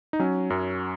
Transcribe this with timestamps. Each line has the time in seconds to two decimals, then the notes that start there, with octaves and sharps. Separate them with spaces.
0.13 D#4
0.19 F#3 C#4
0.50 F#2